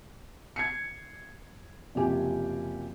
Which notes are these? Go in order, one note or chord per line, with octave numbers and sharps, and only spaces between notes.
G#6 C7 C#7
F#1 C3 F3 G4 G#5